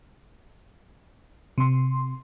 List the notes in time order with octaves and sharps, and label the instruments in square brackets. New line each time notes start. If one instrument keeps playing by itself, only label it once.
[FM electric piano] C3 C6